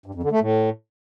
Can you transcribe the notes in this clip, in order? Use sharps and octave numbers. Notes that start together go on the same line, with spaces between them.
G2
F2
D3
A3
A2